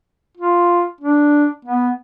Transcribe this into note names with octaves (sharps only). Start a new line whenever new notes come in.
F4
D4
B3